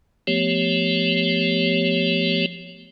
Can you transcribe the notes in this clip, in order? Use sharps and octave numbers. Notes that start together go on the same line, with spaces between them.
F3 A3 B3 G4 C#5